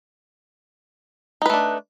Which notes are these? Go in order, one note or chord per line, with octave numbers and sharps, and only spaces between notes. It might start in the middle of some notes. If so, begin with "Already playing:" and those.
A3 D4 D#4 B4